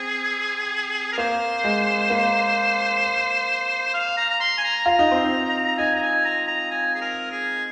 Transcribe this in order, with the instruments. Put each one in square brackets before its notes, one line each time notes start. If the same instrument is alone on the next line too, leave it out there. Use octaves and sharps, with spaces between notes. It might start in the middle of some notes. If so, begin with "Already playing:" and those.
Already playing: [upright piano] C4 [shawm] G#4
[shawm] A#4
[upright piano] A#3 [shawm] C5
[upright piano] G#3
A#3
[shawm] F5
A#5
A#5
C6
G#5
A#5
[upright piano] F4 [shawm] A#5
[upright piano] D#4
C4
D#4
[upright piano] D#4 [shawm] G#5
[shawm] A#5
G#5
A#5
A#5
G#5
G#4
A#4
G#4